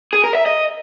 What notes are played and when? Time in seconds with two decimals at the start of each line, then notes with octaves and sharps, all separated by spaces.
0.13 G#4
0.24 A#4
0.35 E5
0.46 D#5